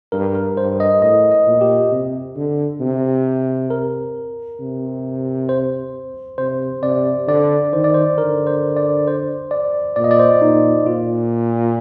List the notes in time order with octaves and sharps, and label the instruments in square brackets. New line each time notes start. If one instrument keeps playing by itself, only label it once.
[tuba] G2 [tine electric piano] A#4
[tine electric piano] A#4
[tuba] G2 [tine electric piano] C5
[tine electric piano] D#5
[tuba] A2 [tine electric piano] D#5
[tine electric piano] D#5
[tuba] A#2
[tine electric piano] G4
[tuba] C3
D3
C3
[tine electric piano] A#4
[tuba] C3
[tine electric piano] C5
[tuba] C3 [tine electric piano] C5
[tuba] C3 [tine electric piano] D5
[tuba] D3 [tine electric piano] D5
[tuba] D#3 [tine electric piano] C5
[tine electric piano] D5
C5
[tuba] D3 [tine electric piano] A#4
[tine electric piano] C5
D5
C5
D5
[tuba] A#2 [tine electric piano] D5
[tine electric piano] D#5
D5
C5
[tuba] A#2 [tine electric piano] D#4
[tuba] A#2 [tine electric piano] F4